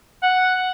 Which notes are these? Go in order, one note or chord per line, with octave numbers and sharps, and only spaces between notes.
F#5